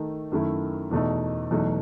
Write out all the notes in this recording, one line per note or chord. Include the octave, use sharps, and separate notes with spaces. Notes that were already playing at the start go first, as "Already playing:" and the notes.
Already playing: D#3 A3 D#4
F#2 D#3 A3 E4
E2 B2 A3 D#4
E2 B2 F#3 A3 D#4